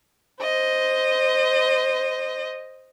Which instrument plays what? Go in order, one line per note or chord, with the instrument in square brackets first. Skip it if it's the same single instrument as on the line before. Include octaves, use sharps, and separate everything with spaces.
[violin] C5 D#5